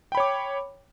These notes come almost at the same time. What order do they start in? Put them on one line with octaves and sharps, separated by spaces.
G5 B5 C#5 D6